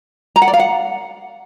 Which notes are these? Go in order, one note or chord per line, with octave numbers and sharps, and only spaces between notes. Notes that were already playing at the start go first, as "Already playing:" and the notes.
A#5
F#5
D5
F5
F#5